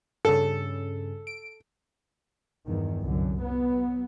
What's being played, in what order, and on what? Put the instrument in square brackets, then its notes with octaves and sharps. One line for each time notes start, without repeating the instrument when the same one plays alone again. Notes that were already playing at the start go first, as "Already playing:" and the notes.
[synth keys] G2 C#3 [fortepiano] A4
[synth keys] D7
[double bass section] E2 G2 D#3
C2 F#2 D3
F#3 B3